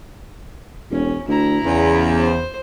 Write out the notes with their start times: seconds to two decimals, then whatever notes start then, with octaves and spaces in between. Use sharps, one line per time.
0.91 E1 C#4
1.28 D2 E4 A#5
1.65 E2 C#3
2.19 C5